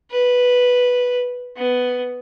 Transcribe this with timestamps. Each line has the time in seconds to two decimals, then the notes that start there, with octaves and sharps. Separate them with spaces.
0.11 B4
1.56 B3